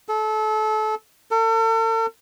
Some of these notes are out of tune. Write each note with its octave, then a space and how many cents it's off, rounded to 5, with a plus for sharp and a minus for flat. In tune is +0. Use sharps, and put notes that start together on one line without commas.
A4 -30
A4 +40